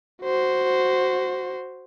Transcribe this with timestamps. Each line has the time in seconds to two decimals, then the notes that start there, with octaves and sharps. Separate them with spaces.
0.23 F#4 C5